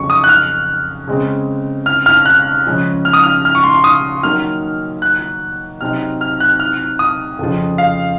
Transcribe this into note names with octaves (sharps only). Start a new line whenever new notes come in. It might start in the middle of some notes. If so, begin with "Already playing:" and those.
Already playing: F2 C#3 F#3 C#4 C#6
D#6
F#6
F6
C#3 G#3 C4
F6
F6
F#6
C#3 F3 G#3 C#4
F6
D#6
F6
F6
C#6
C6
C6
D#6
D#3 F#3 A#3 D#4 F6
F#6
C3 F#3 C4 D#4 F6
F6
F#6
F6
D#6
F2 C#3 F3
F5